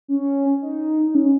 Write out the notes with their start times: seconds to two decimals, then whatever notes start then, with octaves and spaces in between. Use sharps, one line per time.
0.08 C#4
0.62 D#4
1.07 D#4
1.15 C#4